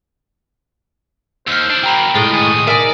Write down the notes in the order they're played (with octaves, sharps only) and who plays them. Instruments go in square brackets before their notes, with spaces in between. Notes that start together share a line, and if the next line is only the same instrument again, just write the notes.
[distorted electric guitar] D#2 [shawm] C5 [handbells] E6 F6
[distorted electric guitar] D4 E4
[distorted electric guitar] F#3 A#3 [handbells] G5 A#5 B5
[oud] A2 G#3 [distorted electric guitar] F4 G5 [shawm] D#6
[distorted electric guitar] D#3 A3 [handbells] G#5
[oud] D#4 E5 [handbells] A#4 G#5 [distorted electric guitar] D5